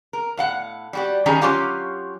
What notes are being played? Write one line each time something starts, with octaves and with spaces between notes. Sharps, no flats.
A#4
A2 F5 F#5
G3 F#4 G4
D#3 G3 C#4 G#4 G#5 A#5
F#3 C4 C#4 F4 G4 F5